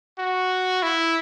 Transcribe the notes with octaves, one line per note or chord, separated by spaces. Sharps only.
F#4
E4